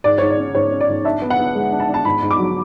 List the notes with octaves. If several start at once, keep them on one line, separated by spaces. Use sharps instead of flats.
G#2 D5
G#2 C#5
D5
C#4
G#2 C#5
C#4
D5
G#2
D4 E5
B3
F#5
B3
G#3
D4
A5
D4
A5
G#2 B5
G#2
D6
F#3